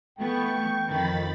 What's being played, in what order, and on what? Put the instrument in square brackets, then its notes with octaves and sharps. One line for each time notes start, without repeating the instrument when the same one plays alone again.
[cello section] E3 A3 B3 [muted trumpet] G5 [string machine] C#6
[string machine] F2 B5 A6 [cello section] D#3